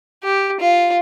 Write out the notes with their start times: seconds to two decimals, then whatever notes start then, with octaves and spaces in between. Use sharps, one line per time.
0.23 G4
0.60 F4